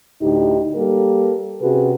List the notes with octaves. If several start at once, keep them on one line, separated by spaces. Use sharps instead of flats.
D2 A2 D#4 G4
G3 A#3 G4 A4 A#4
C3 C#4 F#4 G#4 B4